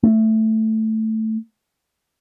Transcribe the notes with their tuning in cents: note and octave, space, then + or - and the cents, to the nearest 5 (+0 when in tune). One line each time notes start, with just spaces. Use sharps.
A3 +5